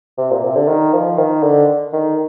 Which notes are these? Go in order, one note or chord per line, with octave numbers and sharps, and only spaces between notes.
C3
A#2
C3
D3
D#3
F3
D#3
D3
D#3